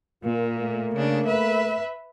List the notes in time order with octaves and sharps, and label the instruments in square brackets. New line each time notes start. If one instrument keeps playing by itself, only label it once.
[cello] A#2 [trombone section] A#3 F4
[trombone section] A3 A#3
[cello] C#3 D4
B4 E5